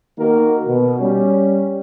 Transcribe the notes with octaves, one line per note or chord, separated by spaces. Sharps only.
D#3 A#3 F#4 A#4
B2
G3 C#4